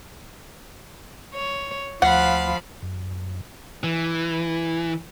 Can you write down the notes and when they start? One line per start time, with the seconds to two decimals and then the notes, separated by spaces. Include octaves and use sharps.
1.34 C#5
2.02 D2 F3 F5 F#5 B5
2.82 F#2
3.83 E3